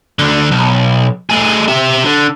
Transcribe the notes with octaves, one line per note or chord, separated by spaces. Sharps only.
D2 D3
B1
A3 G#4
G4 E5
D3